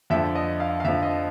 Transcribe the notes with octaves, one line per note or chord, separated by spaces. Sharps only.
F2 D3 F3 E5
D#5
F5
F5
F2 D3 F3 E5
D#5